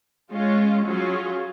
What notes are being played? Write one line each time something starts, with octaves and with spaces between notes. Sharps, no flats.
G#3 C#4 F4
F#3 C#4 F4 G#4